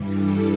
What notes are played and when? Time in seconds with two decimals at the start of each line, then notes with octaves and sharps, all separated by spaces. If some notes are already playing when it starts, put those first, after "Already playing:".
Already playing: G2 E3 G3
0.13 A4